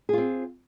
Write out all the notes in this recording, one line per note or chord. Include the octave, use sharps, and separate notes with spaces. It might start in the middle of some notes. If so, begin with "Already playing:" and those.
C4 F4 G#4